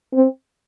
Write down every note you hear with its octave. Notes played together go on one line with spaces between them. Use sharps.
C4